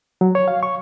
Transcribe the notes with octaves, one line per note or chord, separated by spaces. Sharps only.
F#3
C#5
F5
C#6